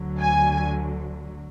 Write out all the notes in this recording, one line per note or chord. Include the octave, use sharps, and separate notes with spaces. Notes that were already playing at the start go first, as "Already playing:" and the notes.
Already playing: D2 D3 F#3
G#5